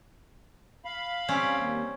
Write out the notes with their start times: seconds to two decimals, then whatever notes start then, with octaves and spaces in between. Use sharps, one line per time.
0.85 F5 B5
1.28 G3 C4 C#4
1.56 D#2